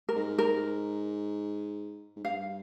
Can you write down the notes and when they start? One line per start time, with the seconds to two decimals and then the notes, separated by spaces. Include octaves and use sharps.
0.09 A#4
0.16 G#2
0.38 A#4
2.16 G#2
2.24 G2 F5